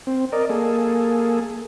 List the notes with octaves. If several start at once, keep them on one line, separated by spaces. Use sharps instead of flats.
C4
A#4 D5 D#5
A#3 G#4 A4